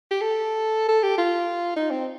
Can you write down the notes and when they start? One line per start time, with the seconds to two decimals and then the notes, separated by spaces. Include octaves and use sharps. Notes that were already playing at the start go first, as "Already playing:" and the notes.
0.11 G4
0.21 A4
0.89 A4
1.03 G4
1.18 F4
1.76 D#4
1.91 C4